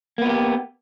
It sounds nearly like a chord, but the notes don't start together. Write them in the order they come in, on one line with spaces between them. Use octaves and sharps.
A#3 B3 F4 G4